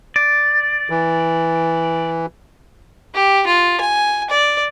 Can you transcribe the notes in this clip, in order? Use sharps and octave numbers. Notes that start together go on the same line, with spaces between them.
D5
E3
G4
F4
G#5
D5